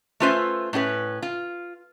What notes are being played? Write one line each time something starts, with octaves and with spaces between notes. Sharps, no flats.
A3 C#4 F4 B4 C5 E5
A2 C#4 F4 B4
F4